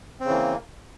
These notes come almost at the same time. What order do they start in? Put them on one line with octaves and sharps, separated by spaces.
C4 C#3 E3 A#3